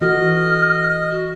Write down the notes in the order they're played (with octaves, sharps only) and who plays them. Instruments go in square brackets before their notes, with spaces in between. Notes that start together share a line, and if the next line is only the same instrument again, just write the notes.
[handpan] E3 F#4 A4 [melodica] D#5 [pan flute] F6
[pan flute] F#4